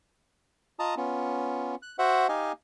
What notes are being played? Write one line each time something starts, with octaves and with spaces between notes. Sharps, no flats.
F4 D#5 A5 A#5 D#6
B3 C#4 F4
F#6
F#4 C5 E5 F#5
D#4 G4 D#5 F5 G#5